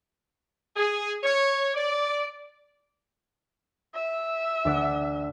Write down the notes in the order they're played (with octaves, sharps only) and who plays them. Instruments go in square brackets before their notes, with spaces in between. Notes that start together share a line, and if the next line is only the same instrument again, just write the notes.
[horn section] G#4
C#5
D5
[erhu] E5
[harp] D2 D5 F#5